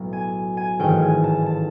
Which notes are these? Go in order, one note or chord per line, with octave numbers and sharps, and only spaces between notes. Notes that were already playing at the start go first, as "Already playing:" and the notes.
Already playing: B1 A2 F#3
G#5
G#5
A1 G#2 D#3 G5
G#5
A5
A5